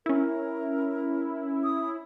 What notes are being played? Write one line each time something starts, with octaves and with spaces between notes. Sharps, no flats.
C#4 E4 A#4
D#6